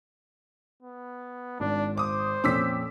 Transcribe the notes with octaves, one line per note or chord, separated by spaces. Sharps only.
B3
G#1 D4
C5 D6 D#6
F2 A#2 C#4 D6 E6 B6